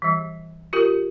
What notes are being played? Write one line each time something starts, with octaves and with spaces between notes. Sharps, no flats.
E3 G3
F4 G4 A#4